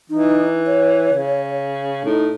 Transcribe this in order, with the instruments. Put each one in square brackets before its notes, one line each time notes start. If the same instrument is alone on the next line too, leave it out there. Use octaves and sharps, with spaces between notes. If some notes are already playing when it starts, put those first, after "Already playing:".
[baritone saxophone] E3 [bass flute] D#4
[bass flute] C#5
[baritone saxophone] C#3
[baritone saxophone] A2 [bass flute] D#4